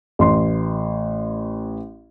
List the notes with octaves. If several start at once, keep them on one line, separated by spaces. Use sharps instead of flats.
A1 C6